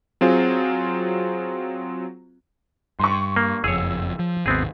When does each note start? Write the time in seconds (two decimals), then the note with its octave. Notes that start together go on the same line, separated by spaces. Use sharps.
0.21 F#3 C4 F4 G#4
3.00 G2 C6 C#6
3.36 A#3
3.64 F#1 F2 G#4 C#5 E6
4.19 F3
4.46 G#1 D#2 B3 C4 G#4